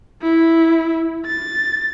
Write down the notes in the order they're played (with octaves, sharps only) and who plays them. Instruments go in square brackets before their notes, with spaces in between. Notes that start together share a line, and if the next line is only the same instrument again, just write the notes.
[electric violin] E4
A6